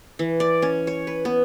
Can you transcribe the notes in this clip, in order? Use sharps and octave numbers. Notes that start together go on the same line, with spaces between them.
E3
D5
C#4
C#5
B4
B3